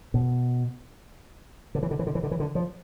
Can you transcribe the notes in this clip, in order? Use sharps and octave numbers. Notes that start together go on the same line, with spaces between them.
B2
D3
E3
D3
E3
D3
E3
D3
E3
D3
F3